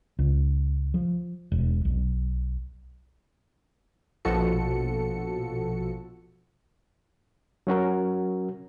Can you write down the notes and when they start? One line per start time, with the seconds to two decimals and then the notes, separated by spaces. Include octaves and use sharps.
0.19 C#2
0.94 F3
1.52 E1
1.85 B1
4.25 A#1 B2 F3 F#4 A4 C#7
7.67 F#3 C#4 F#4 A#4